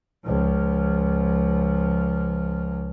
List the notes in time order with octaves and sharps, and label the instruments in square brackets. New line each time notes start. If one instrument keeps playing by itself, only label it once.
[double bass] C#2 F3